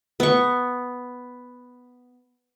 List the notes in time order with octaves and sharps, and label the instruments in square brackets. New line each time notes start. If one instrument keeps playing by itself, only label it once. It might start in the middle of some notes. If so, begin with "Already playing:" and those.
[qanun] B3 C#6